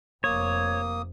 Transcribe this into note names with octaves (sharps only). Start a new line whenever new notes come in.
F1 A#3 C#5 D#6